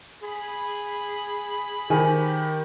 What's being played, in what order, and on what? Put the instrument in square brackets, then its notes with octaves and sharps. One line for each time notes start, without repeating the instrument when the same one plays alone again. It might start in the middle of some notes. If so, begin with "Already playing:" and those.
[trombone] G#4 [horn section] B5
[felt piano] D#3 [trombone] G4 [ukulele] G#4 C5 G#5